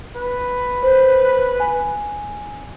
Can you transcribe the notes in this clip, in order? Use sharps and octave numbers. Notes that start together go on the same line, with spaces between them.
B4
C5
G#5